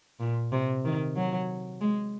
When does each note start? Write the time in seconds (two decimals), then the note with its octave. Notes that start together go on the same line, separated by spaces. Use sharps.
0.20 A#2
0.52 C3
0.85 D#3
1.16 F#3
1.81 G#3